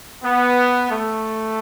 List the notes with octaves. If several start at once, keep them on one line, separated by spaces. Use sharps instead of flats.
B3
A3